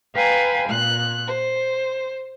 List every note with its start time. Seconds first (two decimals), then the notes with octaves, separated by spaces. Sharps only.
0.14 B4 F5 G5 G#5 A#5
0.68 A#2 F#6
1.27 C5